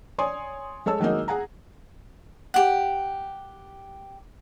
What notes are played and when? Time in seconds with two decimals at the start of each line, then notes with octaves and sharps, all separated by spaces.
0.18 C#5 D5 G#5 C6 D#6
0.86 G#3 A4 C#5 A5 E6
1.00 D#3 F#3 G#3 A#3 D#4
1.28 G#4 F#5 G#5 A#5
2.54 G4 F#5